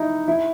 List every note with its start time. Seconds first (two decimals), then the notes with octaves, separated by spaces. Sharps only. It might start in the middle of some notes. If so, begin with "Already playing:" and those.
Already playing: D#4 E4
0.28 E4